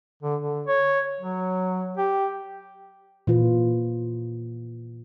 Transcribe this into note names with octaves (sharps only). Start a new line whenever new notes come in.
D3
D3
C#5
F#3
G4
A#2 E3 F4 B4